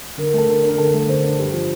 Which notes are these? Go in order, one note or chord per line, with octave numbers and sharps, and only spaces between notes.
D3 A#4
A#4
A3 A4
D3 A#4
A#4
D4
A#4
D3 A4
A3 A#4
D3 C5
D4
G2
F3